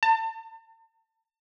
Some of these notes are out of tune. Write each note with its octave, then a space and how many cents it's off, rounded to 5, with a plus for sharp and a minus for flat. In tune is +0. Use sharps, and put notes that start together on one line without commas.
A5 +40